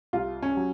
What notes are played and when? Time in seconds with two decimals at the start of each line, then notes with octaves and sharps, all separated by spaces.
0.13 C2 F4
0.42 C#4
0.57 F#3